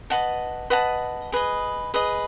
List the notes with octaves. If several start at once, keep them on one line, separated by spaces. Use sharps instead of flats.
B4 D#5 F#5 A5
B4 D#5 F#5 A5
G#4 B4 D#5
G#4 B4 D#5